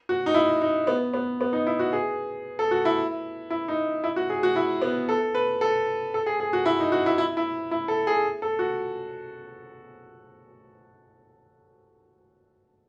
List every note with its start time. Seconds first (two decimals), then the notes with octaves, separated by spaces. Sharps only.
0.09 F#4
0.26 D#4
0.34 E4
0.62 D#4
0.87 B3
1.14 B3
1.41 B3
1.53 D#4
1.67 E4
1.79 F#4
1.93 G#4
2.59 A4
2.71 F#4
2.85 E4
3.50 E4
3.68 D#4
4.04 E4
4.16 F#4
4.30 G#4
4.43 F#4
4.56 E4
4.82 B3
5.09 A4
5.35 B4
5.61 A4
6.14 A4
6.26 G#4
6.40 G#4
6.53 F#4
6.66 E4
6.80 D#4
6.92 F#4
7.06 E4
7.18 E4
7.37 E4
7.71 E4
7.88 A4
8.07 G#4
8.42 A4
8.59 F#4